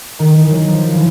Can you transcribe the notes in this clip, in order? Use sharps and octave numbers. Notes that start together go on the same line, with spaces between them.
D#3
E3
F#3
F3
E3